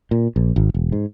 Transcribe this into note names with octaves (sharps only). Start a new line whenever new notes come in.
A#2
A#1
G#1
E1
G#2